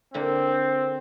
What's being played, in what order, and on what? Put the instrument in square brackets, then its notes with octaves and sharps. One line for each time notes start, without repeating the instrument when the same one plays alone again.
[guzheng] D3 A#3 E4 [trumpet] C4